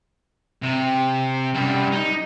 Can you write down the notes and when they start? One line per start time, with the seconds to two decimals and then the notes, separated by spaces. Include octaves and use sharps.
0.62 C3
1.54 F#2 G3
1.92 D#4